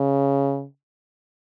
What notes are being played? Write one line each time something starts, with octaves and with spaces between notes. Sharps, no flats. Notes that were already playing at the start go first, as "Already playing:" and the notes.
Already playing: C#3